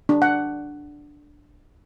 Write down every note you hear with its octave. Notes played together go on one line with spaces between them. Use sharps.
D4
F#5